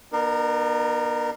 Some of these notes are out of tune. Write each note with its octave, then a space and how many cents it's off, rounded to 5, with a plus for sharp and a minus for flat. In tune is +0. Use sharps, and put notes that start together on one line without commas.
B3 -40 D4 +45 A#4 -10